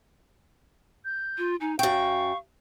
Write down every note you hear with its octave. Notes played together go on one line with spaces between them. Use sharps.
G6
F4
D#4 G#5
F#2 F5 G5 C#6